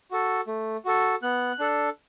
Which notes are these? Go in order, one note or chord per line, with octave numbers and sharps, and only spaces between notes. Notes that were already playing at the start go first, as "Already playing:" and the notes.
F#4 A4
A3
F#4 A4
B3 F#6
D4 A4